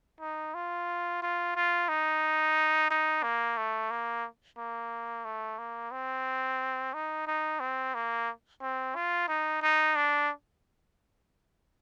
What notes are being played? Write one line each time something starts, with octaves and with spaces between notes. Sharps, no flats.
D#4
F4
F4
F4
D#4
D#4
A#3
A3
A#3
A#3
A3
A#3
C4
D#4
D#4
C4
A#3
C4
F4
D#4
D#4
D4